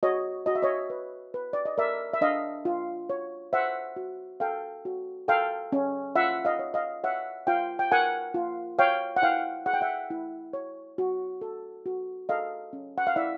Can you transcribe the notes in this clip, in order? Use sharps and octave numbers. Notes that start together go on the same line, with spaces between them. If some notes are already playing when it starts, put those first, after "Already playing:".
F#4 C#5 D#5
F#4 D#5
E5
C#5 D#5
B4
B4
D5
D#5
A#4 D5 E5
E5
D4 D#5 F5
F4
C#5
C5 E5 F#5
F#4
A4 F5 G5
F#4
A4 F5 G5
C#4
F4 E5 F#5
D#5 F5
C#5
D#5 F5
C#5 E5 F#5
F4 F5 G5
G5
A#4 F#5 G#5
F4
C#5 F5 G5
F#5
E4 F5 G5
G#4 F#5
G5
E5 F#5
E4
C#5
F#4
A4
F#4
A4 D#5 F5
C#4
F#5
F5
E4 D5 E5